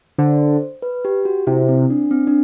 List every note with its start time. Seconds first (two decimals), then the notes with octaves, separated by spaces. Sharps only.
0.18 D3 C5
0.82 B4
1.05 G4
1.25 F#4
1.47 C3 E4
1.69 C4
1.90 D4
2.11 C4
2.27 D4